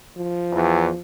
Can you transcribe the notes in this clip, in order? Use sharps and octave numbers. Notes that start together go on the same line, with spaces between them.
F3
E2